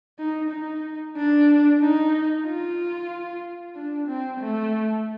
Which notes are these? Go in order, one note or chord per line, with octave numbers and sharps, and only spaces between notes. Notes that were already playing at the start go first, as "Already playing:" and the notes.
D#4
D#4
D4
D#4
F4
D4
C4
A3